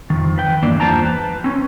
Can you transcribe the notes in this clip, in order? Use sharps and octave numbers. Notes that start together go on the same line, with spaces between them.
F2 D#3
B4 G5
G2 E3 A#3 D4
E2 F3 C5 G5 A5 A#5
B4
C4 C#4